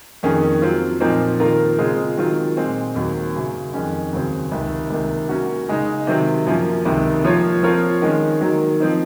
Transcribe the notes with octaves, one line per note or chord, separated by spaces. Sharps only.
F2 D#3 A#3 C#4 G#4
F#3 C4 F4
A#2 F3 C4 D#4 A#4
D#3 A#3 F4 A#4
C#3 G#3 C4 F4 G#4
D#3 F#3 C4 F4
A#2 G#3 C4
D#2 D#3 F#3 A#3
F#2 C#3 F#3
F2 D#3 G#3 C#4
D#2 C#3 F#3 C4
C#2 C3 D#3
C#2 C3 D#3 A#3
F#3 A#3 C#4 F#4
C#3 G#3 D#4
C3 D#3 F#3 C4
F#2 F3 A#3 C#4
C#2 C3 D#3
F3 A#3 F4 A#4 C#5
F3 C4 F4 A#4 C#5
D#3 G#3 C#4
D#3 F#3 A#3
F3 C4 D#4